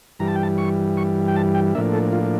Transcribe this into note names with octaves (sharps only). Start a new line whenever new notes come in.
G2 E3 G3 A#5
A5
G5
A5
C#6
C#6
G5
A5
G5
A2 F3 A#3 D4 E5
A4
F4